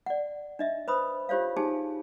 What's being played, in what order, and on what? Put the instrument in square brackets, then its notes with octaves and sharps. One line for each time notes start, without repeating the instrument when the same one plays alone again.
[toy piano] D5 F#5
D4 D#5 E5
B4 C5 B5 D#6
F4 G4 C5 C#5 F5
D#4 G4 G#4 G#5 A5